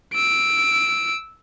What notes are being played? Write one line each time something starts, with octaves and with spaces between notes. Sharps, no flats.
E6 D7